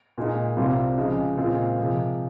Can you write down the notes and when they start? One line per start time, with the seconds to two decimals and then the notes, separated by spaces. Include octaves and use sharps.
0.18 A#2 G#3 D#4
0.57 C2 C3 G3 C4 F4
0.97 C#3 F3 G#3 D#4
1.37 A#2 G#3 C4 F4
1.78 C3 F3 G#3